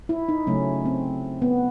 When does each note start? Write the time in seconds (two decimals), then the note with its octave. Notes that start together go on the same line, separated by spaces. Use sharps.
0.09 E4
0.29 D#4
0.47 C#3 F#3 A3 C#4
0.85 C4
1.42 B3